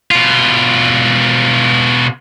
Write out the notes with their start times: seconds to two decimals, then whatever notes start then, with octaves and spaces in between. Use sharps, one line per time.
0.11 B2 F4